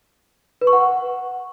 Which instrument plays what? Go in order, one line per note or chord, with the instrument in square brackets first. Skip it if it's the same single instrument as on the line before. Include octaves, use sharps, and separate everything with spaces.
[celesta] B4
C#6
F#5